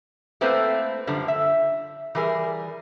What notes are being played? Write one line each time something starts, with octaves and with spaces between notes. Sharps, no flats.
A3 A#3 C4 E4 B4 C5
F#2 D3 F3 G3
E5
E3 G3 G#4 A#4